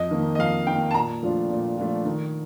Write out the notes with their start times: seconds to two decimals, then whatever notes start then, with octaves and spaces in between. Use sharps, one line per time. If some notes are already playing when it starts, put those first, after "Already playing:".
Already playing: F2 D#5
0.11 D#3 A#3
0.35 D#5
0.39 F2 F5
0.67 D#3 A#3 G5
0.91 A5
0.94 A#2 A#5
1.23 F3 A3 D4 F4
1.50 A#2
1.77 F3 A3 D4 F4
2.05 D#3